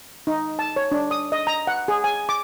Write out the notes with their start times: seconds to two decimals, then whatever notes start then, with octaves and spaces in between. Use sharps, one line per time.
0.27 D#4
0.59 A5
0.76 C#5
0.91 D4
1.11 D#6
1.32 D#5
1.47 A#5
1.67 F#5
1.88 G#4
2.04 G#5
2.29 D6